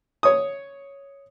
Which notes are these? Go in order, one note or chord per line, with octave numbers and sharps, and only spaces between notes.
C#5 D#6